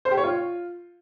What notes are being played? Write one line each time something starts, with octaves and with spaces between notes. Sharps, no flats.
C5
G4
C#5
F4